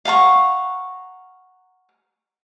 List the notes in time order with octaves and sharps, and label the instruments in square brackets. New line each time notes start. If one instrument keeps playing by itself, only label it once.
[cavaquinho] F5 F#5 A#5 C#6